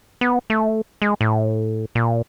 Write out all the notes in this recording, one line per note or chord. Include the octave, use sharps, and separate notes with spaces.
B3
A3
G#3
A2
A#2